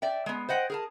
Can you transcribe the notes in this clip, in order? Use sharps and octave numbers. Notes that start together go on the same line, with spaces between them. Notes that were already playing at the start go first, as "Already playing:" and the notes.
D5 E5 G5
G#3 B3
C5 D#5 F#5 G5
G#4 A#4 A5